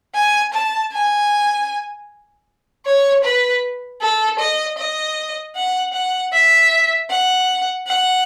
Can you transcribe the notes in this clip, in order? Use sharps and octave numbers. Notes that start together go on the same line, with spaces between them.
G#5
A5
G#5
C#5
B4
A4
D#5
D#5
F#5
F#5
E5
F#5
F#5